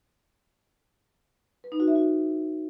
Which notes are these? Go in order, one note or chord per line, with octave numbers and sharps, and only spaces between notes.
B4
D#4
F#4
E5
F#4